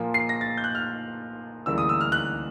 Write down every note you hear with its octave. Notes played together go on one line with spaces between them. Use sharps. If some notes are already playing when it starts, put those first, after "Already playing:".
Already playing: A#2 F3 A#3
C7
A#6
A6
G6
F#6
F6
D2 C#3 E3 G3 A#3 E6
D#6
E6
F6
F#6